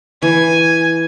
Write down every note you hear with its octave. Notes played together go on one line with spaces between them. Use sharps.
E3 G#5